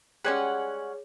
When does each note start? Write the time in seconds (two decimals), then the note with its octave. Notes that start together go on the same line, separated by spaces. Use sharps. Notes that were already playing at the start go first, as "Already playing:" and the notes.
0.25 G3 G#3 C#4 G#4 C#5 F#5 G#5